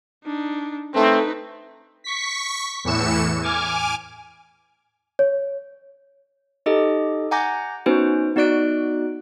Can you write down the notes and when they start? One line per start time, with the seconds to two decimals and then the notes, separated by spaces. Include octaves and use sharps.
0.25 D4 D#4
0.95 A3 C4 D#4 B4
2.04 C#6 B6
2.84 E2 A2 E3 C#7 E7
3.43 G#5 D6 F6
5.19 C#5
6.66 D#4 G4 A4 D#5
7.31 F#5 G#5 A#5 D6 G6 A#6
7.86 B3 C#4 D#4 F#4 B4 C5
8.36 B3 D#4 F#4 D5 F#6 D7